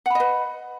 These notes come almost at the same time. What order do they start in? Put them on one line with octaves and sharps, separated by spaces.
F#5 B5 D#5 B4